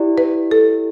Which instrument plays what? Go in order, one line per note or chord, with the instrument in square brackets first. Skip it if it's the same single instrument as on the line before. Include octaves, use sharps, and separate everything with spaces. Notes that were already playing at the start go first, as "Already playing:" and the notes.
Already playing: [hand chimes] E4 G4 D5
[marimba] B4
A4